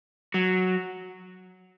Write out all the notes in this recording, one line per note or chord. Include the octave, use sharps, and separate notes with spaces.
F#3